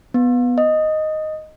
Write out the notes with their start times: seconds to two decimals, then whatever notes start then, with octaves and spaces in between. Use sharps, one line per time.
0.14 B3
0.58 D#5